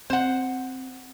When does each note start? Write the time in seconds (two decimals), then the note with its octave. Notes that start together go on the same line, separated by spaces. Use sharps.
0.10 C4 C5 F#5